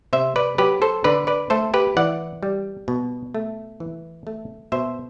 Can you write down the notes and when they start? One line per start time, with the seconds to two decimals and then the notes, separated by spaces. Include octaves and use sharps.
0.13 C3 C5 E5
0.36 B4 D5
0.58 F#3 G4 B4
0.82 A4 C5
1.04 D3 B4 D5
1.27 B4 D5
1.50 A3 A4 C5
1.74 G4 B4
1.97 E3 D5 F#5
2.43 G3
2.88 B2
3.34 A3
3.80 E3
4.27 A3
4.72 B2 C5 E5